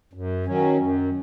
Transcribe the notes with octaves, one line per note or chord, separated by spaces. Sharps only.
F#2
D#3 F#3 C#4
F#2